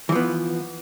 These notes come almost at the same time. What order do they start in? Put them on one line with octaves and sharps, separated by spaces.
E3 F3 B3